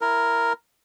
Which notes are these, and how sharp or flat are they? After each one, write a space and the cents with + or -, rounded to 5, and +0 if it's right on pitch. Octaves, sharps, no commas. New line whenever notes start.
E4 +15 A#4 +0